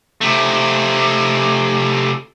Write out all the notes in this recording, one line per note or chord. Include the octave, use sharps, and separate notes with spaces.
C3 A3